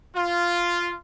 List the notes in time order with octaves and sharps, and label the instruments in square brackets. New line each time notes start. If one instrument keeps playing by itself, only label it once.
[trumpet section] F4